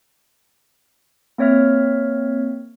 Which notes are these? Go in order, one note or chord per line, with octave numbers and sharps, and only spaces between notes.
A#3 C4 C#5 E5 F6